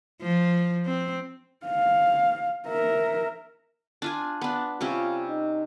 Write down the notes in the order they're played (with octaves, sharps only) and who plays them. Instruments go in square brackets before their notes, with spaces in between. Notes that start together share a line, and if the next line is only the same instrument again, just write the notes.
[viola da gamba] F3
C4
[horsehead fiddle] F5
A#4 E5
[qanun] D4 F4 G#5
B3 D4
[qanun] C3 G3 C#4 [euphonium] F4
[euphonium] D#4